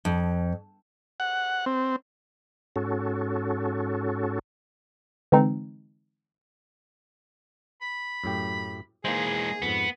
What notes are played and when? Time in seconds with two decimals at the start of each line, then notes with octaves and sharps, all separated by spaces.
0.05 F2
1.20 F#5
1.66 C4
2.76 G#2 C#4 F#4 A4
5.32 D3 E3 G#3 C4 D#4
7.82 B5
8.24 F#2 A2 G4
9.05 E3 G#3 A#3 D#4 G#4 C5
9.62 F2 G#2 B3